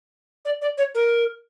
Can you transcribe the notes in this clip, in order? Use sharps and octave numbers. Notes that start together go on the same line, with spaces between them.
D5
D5
C#5
A#4